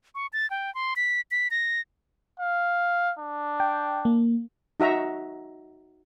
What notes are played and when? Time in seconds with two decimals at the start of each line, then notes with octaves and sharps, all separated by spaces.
0.15 C#6
0.33 A6
0.50 G5
0.75 C6
0.96 B6
1.31 B6
1.51 A#6
2.39 F5
3.19 D4
3.60 G5
4.05 A#3
4.80 D#4 F#4 E5 A#5